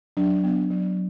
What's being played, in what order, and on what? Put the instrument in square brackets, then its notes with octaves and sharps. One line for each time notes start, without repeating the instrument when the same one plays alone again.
[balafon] F#3 D4
B3 D4
F#3